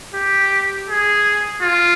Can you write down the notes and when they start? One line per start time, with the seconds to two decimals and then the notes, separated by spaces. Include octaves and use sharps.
0.14 G4
0.89 G#4
1.62 F4